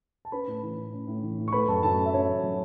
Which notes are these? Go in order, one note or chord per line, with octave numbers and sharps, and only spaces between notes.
A5
C#4 B4 B5
A2
E3
A2
C#4
A2
E3
A2
C#6
A3 B4 B5
F#2 A4 A5
F#3 A4 A5
C#4
E5
A3 C#4 C#5
F#2
F#3